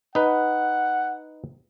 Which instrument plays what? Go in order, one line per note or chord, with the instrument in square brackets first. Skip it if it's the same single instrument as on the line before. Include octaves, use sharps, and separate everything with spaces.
[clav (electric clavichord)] D#4 B4 [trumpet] F#5